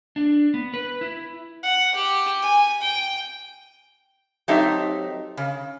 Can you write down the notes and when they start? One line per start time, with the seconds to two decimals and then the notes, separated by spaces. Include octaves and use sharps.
0.16 D4
0.54 B3
0.74 B4
1.01 E4
1.63 F#5
1.95 G4
2.42 G#5
2.82 G5
4.48 F#3 A3 C4 D#4 G4 E5
5.37 C#3